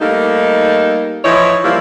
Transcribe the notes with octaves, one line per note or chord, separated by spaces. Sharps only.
G3 A3 A#3 D#4
E3 F3 D#4 E4 C#5
F3 G3 A#3 E4